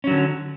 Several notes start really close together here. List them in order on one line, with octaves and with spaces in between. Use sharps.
C#4 F#3 D3